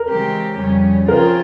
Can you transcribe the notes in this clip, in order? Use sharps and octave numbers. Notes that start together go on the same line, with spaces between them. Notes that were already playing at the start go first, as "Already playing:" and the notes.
Already playing: A#4
C#3 E3 G#3 C4 G4
F2 C#3 G3 C#4
C#3 F3 C4 F4 G#4 A#4